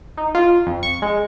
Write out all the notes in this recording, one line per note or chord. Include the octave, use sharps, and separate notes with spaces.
D#4
F4
F2
C#6
G#3